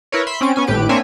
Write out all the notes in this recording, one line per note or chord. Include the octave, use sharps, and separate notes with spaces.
E4 A#4 B4 C#5
E5 B5 C6 B6 C7
C4 C#4 D7
B3 C#4 G#5
G#1 A2 G4 B4 D7
A#3 C4 D4 C#5 E5 G#5